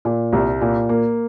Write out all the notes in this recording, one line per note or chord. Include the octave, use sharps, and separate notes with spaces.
A#2
C2
A#2
A#3